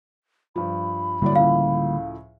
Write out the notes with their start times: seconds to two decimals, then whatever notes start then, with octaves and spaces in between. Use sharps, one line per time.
0.56 G2 F3 B5
1.22 A2 D3 F#3 G3 A#3 D5
1.36 C#2 A2 F3 F5